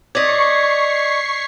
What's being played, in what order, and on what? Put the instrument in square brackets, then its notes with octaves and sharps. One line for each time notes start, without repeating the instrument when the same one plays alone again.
[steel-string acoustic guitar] D5 D#5 [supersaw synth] C#6 C7 [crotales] G#6 B6 F7